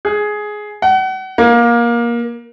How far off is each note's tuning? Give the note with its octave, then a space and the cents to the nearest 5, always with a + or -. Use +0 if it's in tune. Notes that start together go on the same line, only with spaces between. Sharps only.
G#4 +10
F#5 +35
A#3 +20